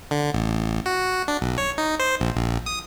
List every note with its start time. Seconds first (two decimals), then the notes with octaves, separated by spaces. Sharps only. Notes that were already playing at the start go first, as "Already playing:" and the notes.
0.11 D3
0.34 A1
0.86 F#4
1.28 D4
1.41 B1
1.58 C#5
1.78 D#4
2.00 C5
2.20 A#1
2.37 A#1
2.66 D#6